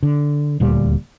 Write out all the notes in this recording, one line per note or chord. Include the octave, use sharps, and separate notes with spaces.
D3
D#1 D2 A#2 G3